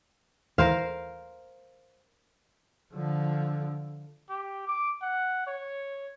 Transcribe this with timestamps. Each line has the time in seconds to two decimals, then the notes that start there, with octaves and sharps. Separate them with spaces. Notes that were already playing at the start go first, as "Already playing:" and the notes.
0.58 D#2 E3 A#4 C5 F5
2.94 D3 F3
4.30 G4
4.67 D6
5.02 F#5
5.47 C#5